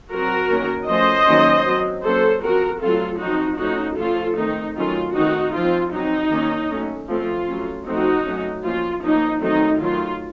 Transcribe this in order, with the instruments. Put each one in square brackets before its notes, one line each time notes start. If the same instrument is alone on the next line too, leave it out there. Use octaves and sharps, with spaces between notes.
[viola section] F#3 C4 F#4 A#4
D#3 A#3 C#4
F3 A3 C#4 C5 D#5
D#3 F#3 A#3 C#4
F#3 C4
F#3 A#3 C#4 A4 C5
F3 C4 F#4 A#4
F#3 A3 C4 F4 A4
F3 C4 D#4 F#4
F3 A3 C#4 D#4 F#4
F3 A3 C#4 F4 A4
D#3 A3 C4 D#4
D#3 F#3 A3 C#4 F4
D#3 A3 C4 D#4 F#4
F3 C4 F4
F#3 C4 D#4
D#3 A#3 C#4
F#3 A3 C#4
F3 A3 C4 F4
F#3 A3 C#4
F3 A3 C4 D#4 F#4
F#3 A3 C#4
F3 A#3 C#4 F4
F3 A#3 C#4 D#4
D#3 F#3 A3 C4 D#4
D#3 F#3 A3 F4